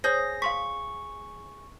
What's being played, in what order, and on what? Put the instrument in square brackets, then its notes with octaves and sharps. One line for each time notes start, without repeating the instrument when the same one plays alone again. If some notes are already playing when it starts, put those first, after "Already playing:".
[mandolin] G#4 G6 [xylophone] C5 C#5 [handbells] A#6
[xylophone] F5 C6 B6 [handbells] C#6